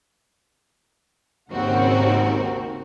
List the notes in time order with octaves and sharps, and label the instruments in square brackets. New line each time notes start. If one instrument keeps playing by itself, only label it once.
[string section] G#1 D#2 C#3 C4 F#4 A#4